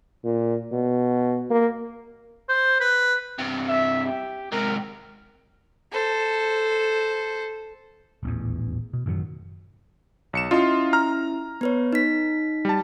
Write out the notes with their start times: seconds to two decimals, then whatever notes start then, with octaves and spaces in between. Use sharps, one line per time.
0.24 A#2
0.72 B2
1.50 A#3
2.49 C5
2.81 B4
3.39 G2 C3
3.69 E5
4.06 G4
4.52 G#2 C3 A#4
5.92 A4 C5
8.23 D#1 A1 E2
8.93 B2
9.06 A1 F#2 D#3 F#3
10.33 B1 C#7 E7
10.51 C#4 E4 F4 D#5 C6
10.93 A#5 F6
11.61 B3 B4 C#5
11.93 D#4 B6
12.65 G3 A5